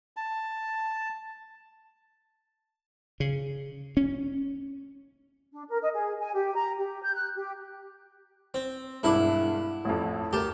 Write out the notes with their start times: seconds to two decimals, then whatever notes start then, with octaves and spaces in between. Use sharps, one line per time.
0.17 A5
3.20 C#3
3.97 C#4
5.52 D4
5.68 A#4
5.81 D#5
5.93 G#4
6.20 G#5
6.34 G4
6.55 A#5
6.78 G4
7.02 G6
7.14 F#6
7.35 G4
8.54 C4
9.03 E1 G2 E4 F#5 D6
9.85 A1 F2
10.33 D2 G4 A#4 A5